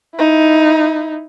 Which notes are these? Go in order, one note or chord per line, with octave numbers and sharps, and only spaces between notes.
D#4 E4